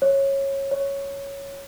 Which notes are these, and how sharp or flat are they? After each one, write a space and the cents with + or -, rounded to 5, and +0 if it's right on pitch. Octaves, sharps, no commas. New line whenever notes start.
C#5 -15
C#5 +0